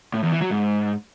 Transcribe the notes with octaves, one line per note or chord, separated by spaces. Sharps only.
A2
E2
E3
F#3
G#2